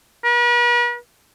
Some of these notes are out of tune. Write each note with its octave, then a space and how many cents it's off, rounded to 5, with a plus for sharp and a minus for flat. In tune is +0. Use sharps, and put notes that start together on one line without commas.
B4 -45